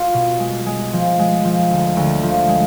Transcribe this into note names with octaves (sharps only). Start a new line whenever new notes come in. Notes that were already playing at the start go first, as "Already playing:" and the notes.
Already playing: F4
B2
G#3
G#3
F3
G#3
F3
D2
D2
F3
G#3